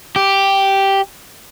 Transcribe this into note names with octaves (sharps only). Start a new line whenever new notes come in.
G4